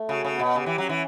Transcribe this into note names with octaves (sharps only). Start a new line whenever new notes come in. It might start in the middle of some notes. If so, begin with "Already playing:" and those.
Already playing: A3
C#3 F#4
C#3
B3
B2
C#3 G4
E3
F#3 C#4
E3